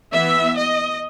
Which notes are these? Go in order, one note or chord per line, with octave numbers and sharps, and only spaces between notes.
E3 B3 E5
D#5